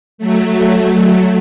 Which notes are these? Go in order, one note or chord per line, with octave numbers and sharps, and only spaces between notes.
F#3 A3